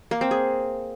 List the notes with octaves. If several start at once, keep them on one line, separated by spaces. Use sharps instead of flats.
A#3
C4
G#4